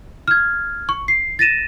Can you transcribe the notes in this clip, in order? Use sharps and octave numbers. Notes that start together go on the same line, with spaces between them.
F6 G#6
C#6
C7
A6 A#6 D#7 E7